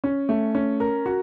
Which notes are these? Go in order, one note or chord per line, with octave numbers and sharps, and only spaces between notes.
C#4
A3
C#4
A#4
F#4